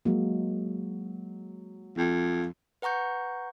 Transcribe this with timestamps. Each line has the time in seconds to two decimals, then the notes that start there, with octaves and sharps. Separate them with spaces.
0.05 F#3 G#3 A#3
1.97 F2
2.82 B4 F#5 A#5 C#6 G6